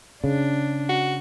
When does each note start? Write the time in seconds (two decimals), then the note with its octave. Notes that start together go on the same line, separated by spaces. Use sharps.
0.24 C#3 D4
0.89 F#4